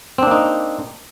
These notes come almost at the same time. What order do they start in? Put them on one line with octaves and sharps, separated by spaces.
C4 D4 A#3 D#4